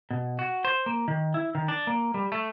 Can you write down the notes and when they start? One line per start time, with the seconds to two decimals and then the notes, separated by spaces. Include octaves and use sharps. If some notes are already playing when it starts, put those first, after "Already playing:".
0.11 B2
0.39 F#4
0.65 C5
0.86 A#3
1.08 D#3
1.34 E4
1.55 D#3
1.68 D4
1.87 A#3
2.14 G3
2.32 A3